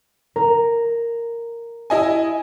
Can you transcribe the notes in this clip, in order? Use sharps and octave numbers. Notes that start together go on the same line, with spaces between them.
A#4
E4 D#5 G#5